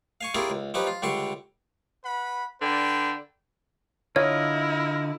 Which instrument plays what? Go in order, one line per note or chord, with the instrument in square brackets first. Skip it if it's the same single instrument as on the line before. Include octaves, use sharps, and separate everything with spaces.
[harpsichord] F5 G#5 C#6
E4 F4 G4 G#4 A#4 C#5
C#2
F3 C#4 D#4 G4 B4
F4
C#2 D3 G3 G5 C6 C#6
[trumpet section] B4 F#5 B5
[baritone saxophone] D3 [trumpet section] B4 D5 G5
[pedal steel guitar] D3 F4 D#5 [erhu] E4 [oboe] A#4 [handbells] C#5